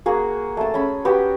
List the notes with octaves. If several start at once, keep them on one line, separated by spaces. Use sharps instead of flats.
A#3 F#4 G#4
A3 A5
C#4 G#4 B5
B3 F#4 G4